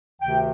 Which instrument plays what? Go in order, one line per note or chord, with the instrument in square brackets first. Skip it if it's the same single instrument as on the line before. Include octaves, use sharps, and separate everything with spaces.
[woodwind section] D2 C3 D#3 G5